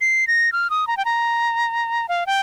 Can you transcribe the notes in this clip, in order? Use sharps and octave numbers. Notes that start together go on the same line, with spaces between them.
C7
A#6
F6
D#6
A#5
G5
A#5
F5
G5